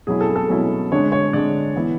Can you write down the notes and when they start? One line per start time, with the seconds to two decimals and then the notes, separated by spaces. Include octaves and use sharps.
0.07 B2 F#3 C#4 E4 G#4
0.21 A4
0.36 A4
0.49 B2 F#3 C#4 E4
0.91 D3 G#3 D4 C#5
1.12 C#5
1.33 D3 G#3 D4 D5
1.75 E3 B3 E4